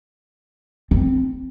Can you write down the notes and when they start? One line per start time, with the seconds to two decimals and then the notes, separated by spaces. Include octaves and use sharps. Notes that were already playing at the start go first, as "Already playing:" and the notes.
0.91 C4